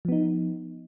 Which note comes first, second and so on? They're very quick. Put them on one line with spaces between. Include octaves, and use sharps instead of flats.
F3 B3 D#4